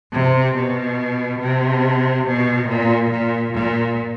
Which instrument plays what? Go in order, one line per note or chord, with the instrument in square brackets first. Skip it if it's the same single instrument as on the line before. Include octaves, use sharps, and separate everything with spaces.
[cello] C3
B2
C3
B2
A#2
A#2
A#2